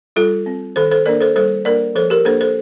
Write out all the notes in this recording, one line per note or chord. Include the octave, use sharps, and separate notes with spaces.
G3 F4 A4
C4
D#3 A4 C5
A4 C5
A#3 D4 A#4 D5
A4 C5
G3 A4 C5
A#3 D4 A#4 D5
F3 A4 C5
G4 A#4
A#3 D4 A4 C5
A4 C5